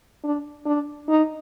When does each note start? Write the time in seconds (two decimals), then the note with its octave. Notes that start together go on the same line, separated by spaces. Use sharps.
0.24 D4
0.66 D4
1.09 D#4